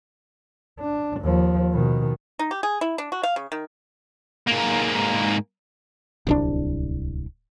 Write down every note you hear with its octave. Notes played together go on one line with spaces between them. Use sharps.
D4
D#2 F3
B2 D#3
D#4
G4
G#4
E4
D4
F#4
F5
C#3
D#3
G#2 A#3
D1 C2 D4